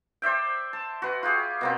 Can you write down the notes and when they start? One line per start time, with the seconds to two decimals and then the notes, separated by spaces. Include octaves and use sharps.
0.22 C5 D5 E5 G5
0.73 A5
1.02 F#4 B4
1.23 F4 G4 G#4
1.61 B2 A#3 C4